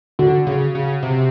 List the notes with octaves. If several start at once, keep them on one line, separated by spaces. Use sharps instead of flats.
D3 F#4
C#3
C#3
C3